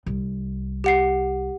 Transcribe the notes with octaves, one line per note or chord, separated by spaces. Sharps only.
C2
G4 F#5 C7